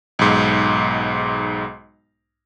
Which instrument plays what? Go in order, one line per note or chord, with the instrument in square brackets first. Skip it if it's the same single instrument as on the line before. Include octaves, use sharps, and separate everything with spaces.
[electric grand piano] B1 G#2